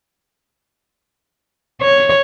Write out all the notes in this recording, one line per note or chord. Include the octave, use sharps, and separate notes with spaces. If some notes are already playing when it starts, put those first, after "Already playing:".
C#5